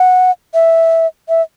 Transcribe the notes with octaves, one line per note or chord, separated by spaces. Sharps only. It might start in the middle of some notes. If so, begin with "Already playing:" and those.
Already playing: F#5
E5
E5